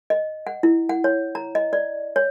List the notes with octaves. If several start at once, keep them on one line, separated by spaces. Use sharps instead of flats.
D#5
F#5
E4
F#5
C#5
A#5
D#5
D5
C#5